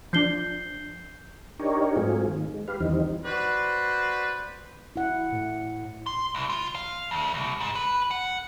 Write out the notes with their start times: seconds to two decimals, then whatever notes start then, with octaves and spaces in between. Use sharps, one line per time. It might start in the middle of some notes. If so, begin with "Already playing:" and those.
0.13 F3 D4 G6 C7 G7
1.60 D4 D#4 G4 A#4 C#5
1.96 G#2 F#3 A3 C4 F4 G#4
2.27 D#3
2.54 G#3
2.68 G4 B4 F5
2.80 E2 D#3 E3 G3 C4 D#4
3.25 F#4 B4 C5 D5
4.96 E4 F#5
5.32 A2
6.06 C6
6.35 C2
6.49 F4
6.75 F5
7.11 D2
7.34 C2
7.60 G#2
7.75 B4
8.11 F#5